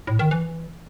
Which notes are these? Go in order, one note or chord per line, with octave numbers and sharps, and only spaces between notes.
A2
D#3
E3